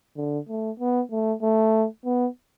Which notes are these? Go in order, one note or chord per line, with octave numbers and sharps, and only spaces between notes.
D3
A3
B3
A3
A3
B3